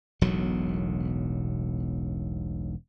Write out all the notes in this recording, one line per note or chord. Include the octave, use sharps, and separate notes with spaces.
E1 B1 A2 F#3